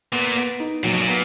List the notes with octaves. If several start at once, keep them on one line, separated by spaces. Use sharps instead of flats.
A#2 B3
B3
D#4
A#2 F#3
B2
A#2
B3